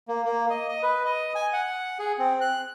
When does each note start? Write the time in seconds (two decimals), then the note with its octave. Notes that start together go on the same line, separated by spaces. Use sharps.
0.08 A#3
0.25 A#3
0.50 D#5
0.69 D#5
0.83 B4
1.05 D#5
1.35 G#5
1.53 F#5
1.99 G#4
2.18 C4
2.41 F#6